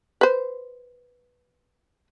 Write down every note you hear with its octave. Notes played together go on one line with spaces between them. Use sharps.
B4 C5